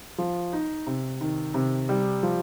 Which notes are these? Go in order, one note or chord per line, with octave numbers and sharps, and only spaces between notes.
F3
D#4
C3
D#3
C3
G3
F3